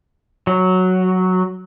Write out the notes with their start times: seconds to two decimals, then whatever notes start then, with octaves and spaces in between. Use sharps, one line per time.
0.47 F#3